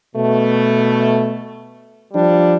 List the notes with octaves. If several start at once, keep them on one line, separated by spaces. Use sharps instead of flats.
B2 A3
F3 G3 D4